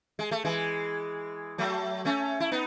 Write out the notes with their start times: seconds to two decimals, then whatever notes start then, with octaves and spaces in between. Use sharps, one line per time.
0.19 G#3
0.31 A3
0.45 E3 G#3
1.58 F#3 A3
2.05 A3 C#4
2.40 E4
2.52 B3 D#4